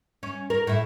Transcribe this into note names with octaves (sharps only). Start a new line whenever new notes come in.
C#4
A#4
A2 E5